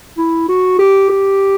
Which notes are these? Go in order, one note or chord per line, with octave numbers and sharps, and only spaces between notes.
E4
F#4
G4
G4